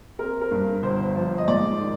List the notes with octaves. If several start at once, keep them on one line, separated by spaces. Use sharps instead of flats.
C4 A#4
A#4
G2
G1 C5
F3
D#5
G#2 D5
D#3